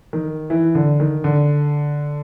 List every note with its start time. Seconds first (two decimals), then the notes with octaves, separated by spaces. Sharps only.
0.13 D#3
0.50 E3
0.75 D3
1.00 D#3
1.24 D3